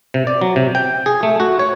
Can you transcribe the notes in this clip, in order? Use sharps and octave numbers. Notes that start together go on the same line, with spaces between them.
C3
D5
F#3
C3
G5
G#4
A3
F#4
C#5